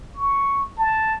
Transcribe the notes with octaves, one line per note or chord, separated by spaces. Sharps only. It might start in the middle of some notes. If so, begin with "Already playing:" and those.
C#6
A5